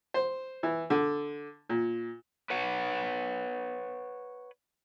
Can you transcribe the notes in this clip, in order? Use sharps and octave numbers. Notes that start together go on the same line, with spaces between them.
C5
E3
D3
A#2
B4 C#5 F#5